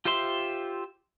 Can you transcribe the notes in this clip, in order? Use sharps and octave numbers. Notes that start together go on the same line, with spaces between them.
F4 G4 C5 E5 C6